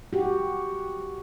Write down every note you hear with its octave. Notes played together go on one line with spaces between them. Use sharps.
F#4 G4